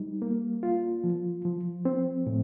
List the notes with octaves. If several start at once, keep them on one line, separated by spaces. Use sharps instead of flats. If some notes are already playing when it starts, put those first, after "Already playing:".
Already playing: G3 D#4
A#3
F4
F3
F3
C4
A2